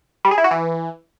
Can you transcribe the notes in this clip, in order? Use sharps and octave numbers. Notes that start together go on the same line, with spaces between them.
G3
G#4
E4
F#4
E3